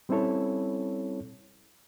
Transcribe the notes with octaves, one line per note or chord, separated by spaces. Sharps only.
G3 C4 C#4 E4 A4 C#5